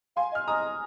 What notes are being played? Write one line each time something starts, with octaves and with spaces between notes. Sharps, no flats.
F5 G#5 C6
D#5
F6
D#5 A#5 D#6